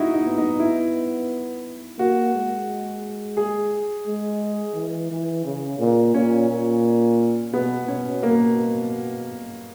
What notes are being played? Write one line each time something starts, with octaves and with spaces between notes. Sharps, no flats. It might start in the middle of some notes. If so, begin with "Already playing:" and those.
Already playing: D#4 E4 F#4
D#4
B3
D#4
E4
A#3 F#4
G#3
G#4
G#3
E3
E3
C#3
A#2
A#2 C#4
A#2
B2 B3
B2 C#4
A#3